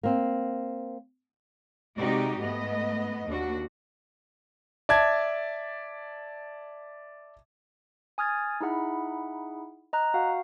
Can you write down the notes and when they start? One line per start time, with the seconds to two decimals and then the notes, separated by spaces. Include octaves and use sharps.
0.03 A#3 C4
1.98 C3 G#3 D#4 F#4 G4 D5
2.39 G#2 A3 B3 D#5
3.28 D#2 D4 F#4
4.89 D5 E5 A5 G#6
8.18 G#5 D#6 F6 G#6 A6
8.61 D#4 E4 G#4 F#5 B5
9.93 D#5 A#5 F#6
10.14 F#4 F5 F#5